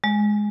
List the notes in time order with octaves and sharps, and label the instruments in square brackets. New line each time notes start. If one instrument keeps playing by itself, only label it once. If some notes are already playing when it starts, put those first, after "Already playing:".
[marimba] G#3